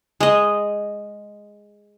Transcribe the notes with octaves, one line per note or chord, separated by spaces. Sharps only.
G#3 D#5